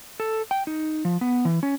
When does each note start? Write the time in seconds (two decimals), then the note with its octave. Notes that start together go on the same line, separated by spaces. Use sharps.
0.20 A4
0.51 G5
0.67 D#4
1.05 F3
1.21 B3
1.45 E3
1.63 C#4